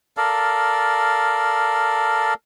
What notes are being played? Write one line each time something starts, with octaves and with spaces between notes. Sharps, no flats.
A4 A#4 D5 F5